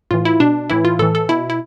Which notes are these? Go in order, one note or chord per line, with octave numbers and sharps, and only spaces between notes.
A2 E3 F4
E4
B2 D4
A2 E3 E4
F4
A2 E3 A4
A4
B2 E4
E4